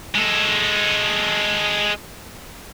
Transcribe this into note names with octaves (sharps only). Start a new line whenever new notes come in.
G#3 A4